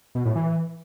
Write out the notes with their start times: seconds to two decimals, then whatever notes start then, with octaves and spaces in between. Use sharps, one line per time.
0.15 B2
0.25 A2
0.36 E3